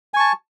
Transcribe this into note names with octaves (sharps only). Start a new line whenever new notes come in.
G#5 A5 C#6